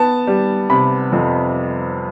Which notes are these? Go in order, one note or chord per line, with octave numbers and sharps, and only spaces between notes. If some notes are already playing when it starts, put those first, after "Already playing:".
Already playing: B3 A5
G3
C3 B5
F2